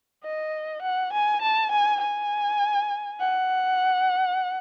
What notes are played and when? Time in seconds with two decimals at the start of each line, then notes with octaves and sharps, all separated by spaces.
0.24 D#5
0.82 F#5
1.13 G#5
1.42 A5
1.72 G#5
2.01 G#5
3.20 F#5